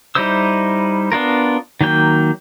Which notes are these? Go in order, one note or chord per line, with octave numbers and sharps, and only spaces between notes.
G3 D#4 E4 C5 E6
B3 D4 F4 A#4
D#3 F#3 A#3 G5